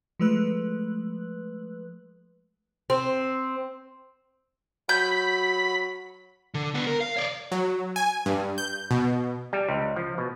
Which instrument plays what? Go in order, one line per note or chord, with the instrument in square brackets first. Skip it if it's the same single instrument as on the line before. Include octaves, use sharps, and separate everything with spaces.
[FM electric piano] F3 G#3 A3 B4 F#6
[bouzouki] C4
[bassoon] F#3 [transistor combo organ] B5 [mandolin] G6
[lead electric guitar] D3
B3 D4
A#4
F5
C#5 D5
[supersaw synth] F#3
G#5
G2
G6
B2
[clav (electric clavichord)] G3
C#2
F3
B2